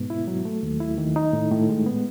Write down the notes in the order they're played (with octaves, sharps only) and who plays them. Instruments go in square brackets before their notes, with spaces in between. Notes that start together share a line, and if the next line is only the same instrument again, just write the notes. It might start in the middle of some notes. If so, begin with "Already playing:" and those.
Already playing: [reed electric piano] G#2 B2 B3
E4
F#3
A3
D#2
E4
D#3
D#4
A2
A2
G#3
B3